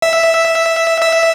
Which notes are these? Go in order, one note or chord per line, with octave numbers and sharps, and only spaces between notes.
E5
E5